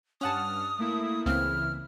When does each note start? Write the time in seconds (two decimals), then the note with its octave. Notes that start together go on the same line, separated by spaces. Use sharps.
0.21 G2 C#4 F#5 A5 D#6 F6
0.78 A3 A#3 E4
1.26 C#2 C#3 E3 A#3 C4 E4 F6